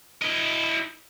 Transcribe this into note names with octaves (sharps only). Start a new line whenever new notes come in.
E4 D#5